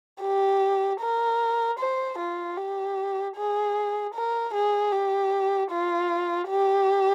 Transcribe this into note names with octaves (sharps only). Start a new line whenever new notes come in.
G4
A#4
C5
F4
G4
G#4
A#4
G#4
G4
F4
G4